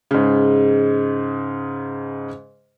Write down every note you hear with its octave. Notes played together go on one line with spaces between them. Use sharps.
G#2 C#3